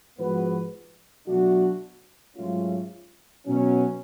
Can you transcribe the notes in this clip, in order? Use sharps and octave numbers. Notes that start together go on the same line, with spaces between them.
G#2 F3 B3 F#4 B4
B2 F#3 A3 D4 F#4
G#2 F#3 A3 C#4 F4
B2 F#3 C#4